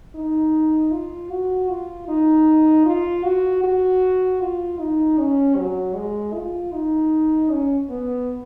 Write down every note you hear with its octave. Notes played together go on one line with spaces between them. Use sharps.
D#4
F4
F#4
F4
D#4
F4
F#4
F#4
F4
D#4
C#4
F#3
G#3
F4
D#4
C#4
B3